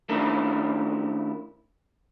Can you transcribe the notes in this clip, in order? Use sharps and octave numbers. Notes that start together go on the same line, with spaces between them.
D#3 A3 C#4 D4 E4 A#4